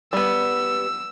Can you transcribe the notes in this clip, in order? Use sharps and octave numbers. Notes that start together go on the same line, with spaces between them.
G3 B3 E6